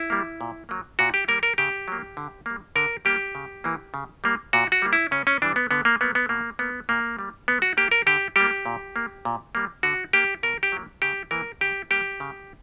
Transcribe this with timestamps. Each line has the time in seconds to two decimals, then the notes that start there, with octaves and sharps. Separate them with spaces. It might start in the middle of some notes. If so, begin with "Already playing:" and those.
Already playing: E4
0.10 G3 A#3
0.41 A#2
0.69 F#3 A#3
0.99 A#2 F#4
1.14 G4
1.28 G3 A#3 A#4
1.43 A#4
1.58 C#3 G4
1.88 F#3 A#3
2.17 D3
2.46 G3 A#3
2.75 D3 A#4
3.05 G3 A#3 G4
3.35 C#3
3.64 E3 A#3
3.94 C#3
4.24 G3 A#3
4.53 A#2 F#4
4.72 F#4
4.82 G3 A#3
4.93 E4
5.11 C#3 C#4
5.27 C#4
5.42 E3 G3 D4
5.56 B3
5.71 D3 B3
5.85 A#3
6.01 F#3 A#3 B3
6.15 B3
6.29 B2 A#3
6.59 A#3 B3
6.89 A#2 A#3
7.19 G3 A#3
7.48 B2 B3
7.62 F#4
7.77 A#3 G4
7.91 A#4
8.07 D3 G4
8.36 G3 A#3 G4
8.66 A#2
8.96 A#3
9.25 A#2
9.55 G3 A#3
9.83 D3 F#4
10.13 A#3 G4
10.43 B2 A#4
10.63 G4
10.72 F#3 A#3
11.02 C#3 G4
11.31 E3 A#3 A#4
11.61 C#3 G4
11.90 G3 A#3 G4
12.20 C#3